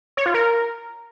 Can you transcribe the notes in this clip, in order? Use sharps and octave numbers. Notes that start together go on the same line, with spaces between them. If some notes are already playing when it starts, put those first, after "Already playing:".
C#5
F4
A#4